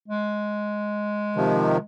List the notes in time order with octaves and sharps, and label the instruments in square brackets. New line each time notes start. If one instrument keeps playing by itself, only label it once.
[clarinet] G#3
[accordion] C3 D#3 F3